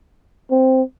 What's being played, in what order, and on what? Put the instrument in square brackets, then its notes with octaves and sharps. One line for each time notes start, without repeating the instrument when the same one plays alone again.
[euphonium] C4